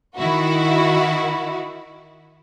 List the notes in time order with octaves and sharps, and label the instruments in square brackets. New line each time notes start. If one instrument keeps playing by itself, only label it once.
[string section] D#3 E4 F#4